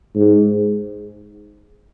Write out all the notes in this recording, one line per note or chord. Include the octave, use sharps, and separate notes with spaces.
G#2